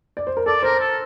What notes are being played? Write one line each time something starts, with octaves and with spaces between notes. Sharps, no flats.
D5
C5
A#4
A4 D5
A#4 C5
A4